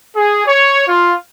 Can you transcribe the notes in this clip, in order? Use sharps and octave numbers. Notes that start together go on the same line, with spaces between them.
G#4
C#5
F4